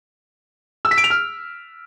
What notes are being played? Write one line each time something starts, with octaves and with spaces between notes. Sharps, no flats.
E6
B6
D7
F7
F6